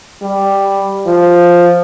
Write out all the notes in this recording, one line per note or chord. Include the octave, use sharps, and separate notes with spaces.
G3
F3